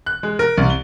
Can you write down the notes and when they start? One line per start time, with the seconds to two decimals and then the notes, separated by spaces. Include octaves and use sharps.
0.06 F#6
0.23 G#3
0.39 A#4
0.57 C2
0.70 G7